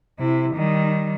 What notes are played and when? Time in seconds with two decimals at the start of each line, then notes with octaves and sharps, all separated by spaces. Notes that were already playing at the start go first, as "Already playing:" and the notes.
0.19 C3 E4
0.55 D#3 G3